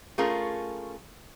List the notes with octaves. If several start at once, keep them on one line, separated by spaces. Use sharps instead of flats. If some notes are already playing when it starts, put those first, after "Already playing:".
A3 C#4 F4 G#4 A#4